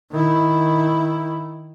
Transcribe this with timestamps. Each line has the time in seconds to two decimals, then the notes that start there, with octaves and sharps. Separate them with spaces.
0.11 D#3 E4